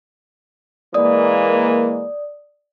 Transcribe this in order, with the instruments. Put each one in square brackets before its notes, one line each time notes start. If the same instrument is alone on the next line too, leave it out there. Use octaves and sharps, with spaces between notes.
[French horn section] E3 G#3 A#3 [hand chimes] D5 D#6